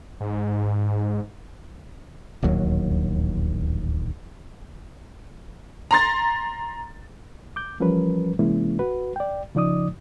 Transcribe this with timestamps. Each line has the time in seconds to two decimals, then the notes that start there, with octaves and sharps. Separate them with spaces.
0.21 G#2
2.42 D1 A#1 D#2 F#3
5.91 A#5 C6 A6
7.56 D6 G6
7.80 E3 F3 G3 C#4 A#4 B4
8.39 C3 E3 G#3 A#3 C#4 E4
8.79 F#4 B4
9.16 D5 G5
9.55 C#3 F3 D#4 D5 D6 D#6